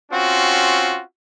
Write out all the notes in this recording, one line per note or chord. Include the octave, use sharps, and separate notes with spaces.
C4 C#4 F4 F#4